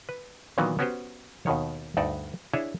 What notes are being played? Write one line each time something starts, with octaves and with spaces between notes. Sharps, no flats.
B4
A#2 D#3 E3 F#3 B3 D#4
B3 C#4 F#4 G4 B4 C5
D#2 B2 D#3 C#5
D2 G2 D#4 A4 D5
D4 E4 G#4 C#5 E5